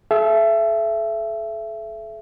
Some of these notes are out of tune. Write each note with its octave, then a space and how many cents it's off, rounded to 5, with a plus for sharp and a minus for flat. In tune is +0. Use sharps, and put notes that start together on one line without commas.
A4 -40 E5 +25